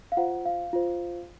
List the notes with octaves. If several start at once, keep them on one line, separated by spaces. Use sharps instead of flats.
F5
F4 C5 F#5
F5
F4 C5